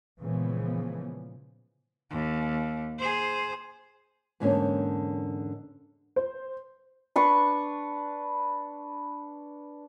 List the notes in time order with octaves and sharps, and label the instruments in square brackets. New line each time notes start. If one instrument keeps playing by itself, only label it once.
[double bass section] A#2 C#3 E3 F3 G#3 B3
[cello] D#2
G#4 C5
[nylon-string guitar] E2 G#2 D3 A#3 C#4 A5
[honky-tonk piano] C5
[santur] D4 B4 C#6